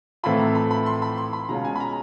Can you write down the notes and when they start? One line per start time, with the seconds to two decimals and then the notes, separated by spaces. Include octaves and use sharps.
0.23 A2 E3 A3 C4 F4 B5
0.39 A#5
0.55 B5
0.71 B5
0.86 C6
1.02 B5
1.18 C6
1.33 B5
1.49 B2 G#3 C#4 F4 A#5
1.65 G#5
1.75 B5
1.80 A#5